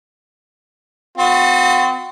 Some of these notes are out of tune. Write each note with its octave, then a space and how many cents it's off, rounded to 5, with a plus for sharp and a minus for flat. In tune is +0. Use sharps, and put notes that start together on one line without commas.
C4 -40 F#4 -35